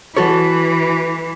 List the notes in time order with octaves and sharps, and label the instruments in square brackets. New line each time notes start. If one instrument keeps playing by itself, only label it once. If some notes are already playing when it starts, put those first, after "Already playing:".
[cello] E3 [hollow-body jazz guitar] F#4 A4 C#5